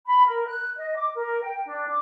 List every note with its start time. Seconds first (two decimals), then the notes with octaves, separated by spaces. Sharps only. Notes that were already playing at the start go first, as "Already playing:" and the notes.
0.06 B5
0.26 A#4
0.47 F#6
0.76 D#5
0.96 D6
1.16 A#4
1.42 G5
1.66 D4
1.88 D6